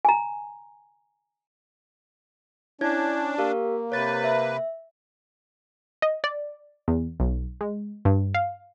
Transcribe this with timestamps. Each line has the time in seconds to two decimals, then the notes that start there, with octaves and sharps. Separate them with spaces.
0.05 G#5 A#5
2.81 C#4 D4 E4 C#5 G#6
3.38 A#3 G4 A#4 F5
3.92 C3 B4 C#5 A6
4.24 E5
6.02 D#5
6.24 D5
6.88 E2
7.20 B1
7.61 G#3
8.05 G2
8.35 F5